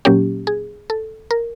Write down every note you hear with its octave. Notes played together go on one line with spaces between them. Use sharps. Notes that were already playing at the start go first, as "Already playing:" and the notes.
A#2 F#3 A#3 C#4 G4
G#4
A4
A#4